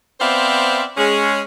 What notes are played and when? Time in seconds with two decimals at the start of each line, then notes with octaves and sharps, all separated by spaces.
0.20 B3 C4 C5 D5 E5 F5
0.97 G#3 C#4 G#4